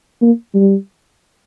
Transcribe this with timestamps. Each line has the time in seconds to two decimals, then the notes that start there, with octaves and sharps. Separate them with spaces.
0.21 A#3
0.55 G3